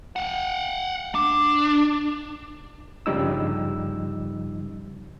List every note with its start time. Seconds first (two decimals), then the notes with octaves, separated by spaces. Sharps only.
0.16 F5 F#5
1.15 D4
3.06 G2 C#3 F3 G3 D#4 E6